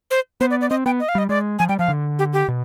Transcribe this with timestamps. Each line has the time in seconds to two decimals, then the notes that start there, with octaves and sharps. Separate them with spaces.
0.11 C5
0.41 B3 C5
0.50 D5
0.61 D5
0.70 C4 D#5
0.86 B3 G5
1.00 D#5
1.09 F5
1.15 G3 D#5
1.29 G#3 D5
1.59 F3 G#5
1.69 G3 G5
1.79 F3 F5
1.88 D3
2.19 G4
2.33 G4
2.48 B2